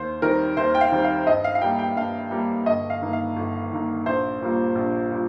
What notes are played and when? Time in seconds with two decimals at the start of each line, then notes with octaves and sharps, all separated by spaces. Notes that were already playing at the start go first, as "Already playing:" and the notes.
Already playing: D#2 C5
0.22 D#3 G3 C4 A#4
0.57 D#2 C5
0.75 G5
0.81 F5
0.92 D#3 G3 C4
1.04 F5
1.27 G2 D#5
1.44 F5
1.55 F5
1.61 G3 A#3 G5
1.79 G5
1.97 G2 F5
2.31 G3 A#3
2.66 G1 D#5
2.90 F5
3.01 G2 D#3 A#3
3.13 F5
3.36 G1
3.71 G2 D#3 A#3
4.06 A#1 C5
4.40 A#2 G3 A#3
4.75 A#1
5.11 A#2 G3